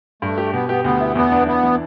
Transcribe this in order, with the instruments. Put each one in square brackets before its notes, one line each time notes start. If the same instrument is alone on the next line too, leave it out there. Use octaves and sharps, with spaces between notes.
[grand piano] G2 [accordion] A3
[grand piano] G4
[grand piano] B2 [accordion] B3
[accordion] B3 [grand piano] G4
[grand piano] D2 [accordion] B3
[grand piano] E4
[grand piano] E2 [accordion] B3
[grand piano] D4
[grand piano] E3 [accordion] B3
[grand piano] E3